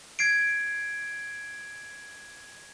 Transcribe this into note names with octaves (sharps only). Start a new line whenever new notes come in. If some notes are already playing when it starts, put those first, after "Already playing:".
G#6 C7 D7